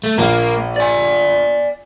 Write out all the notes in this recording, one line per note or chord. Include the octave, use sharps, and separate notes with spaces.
A3
A#1 A#3
D5 G#5